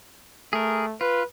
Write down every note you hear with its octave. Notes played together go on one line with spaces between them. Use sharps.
A3 G#4 A#4
F4 B4